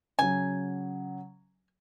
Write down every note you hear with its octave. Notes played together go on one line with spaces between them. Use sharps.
C#3 F#3 G#5